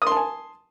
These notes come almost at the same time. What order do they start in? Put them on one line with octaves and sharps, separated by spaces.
D#6 C6 A5 G#5